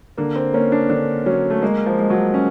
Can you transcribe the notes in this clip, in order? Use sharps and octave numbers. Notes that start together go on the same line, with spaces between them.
D3 A#3
C4
A#3 C#4
D4
D3 D4
F#3 C#4
A3
G#3 A#3
F3
G#3
F#3
C#4